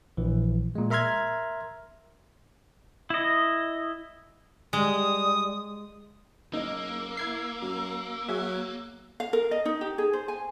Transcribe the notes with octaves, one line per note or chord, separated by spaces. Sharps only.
A#1 E3
A#2 G#3
A#4 E5 A#5 C6 F6 G#6
E4 D#5
G3 G#3 D#6
F#1 A#3 D#4 D#5 E6
E4 G#6 C7
F#2
F#3 F#4 G#4 E5
F5
A#4
D#5
D#4
G4
G#4
C5
G#5